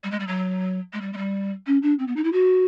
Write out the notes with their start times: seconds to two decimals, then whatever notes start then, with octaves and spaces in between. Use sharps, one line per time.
0.03 G3
0.11 G#3
0.20 G3
0.27 F#3
0.93 G#3
1.01 G3
1.13 G#3
1.17 G3
1.67 C#4
1.82 D4
1.99 C4
2.07 B3
2.16 D#4
2.24 E4
2.32 F#4